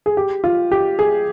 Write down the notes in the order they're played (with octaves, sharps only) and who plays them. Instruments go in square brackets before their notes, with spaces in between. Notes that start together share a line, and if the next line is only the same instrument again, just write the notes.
[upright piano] G#4
G4
F4
G4
G#4